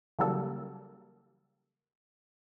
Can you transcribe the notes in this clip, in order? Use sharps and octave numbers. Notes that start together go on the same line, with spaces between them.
C#3 E3 F#3 G3 A#3 A4